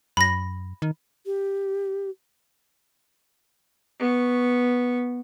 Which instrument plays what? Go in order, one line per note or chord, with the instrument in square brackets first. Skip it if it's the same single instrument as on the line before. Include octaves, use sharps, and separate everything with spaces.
[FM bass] F#2 [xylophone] B5 A#6
[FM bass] D#3
[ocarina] G4
[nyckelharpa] B3 C#6